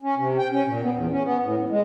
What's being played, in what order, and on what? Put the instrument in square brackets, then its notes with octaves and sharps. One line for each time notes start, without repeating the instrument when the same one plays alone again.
[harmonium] C#4
C3
G5
C#4
A#2
B3
E2
C#4
B3
A2
A2
G#3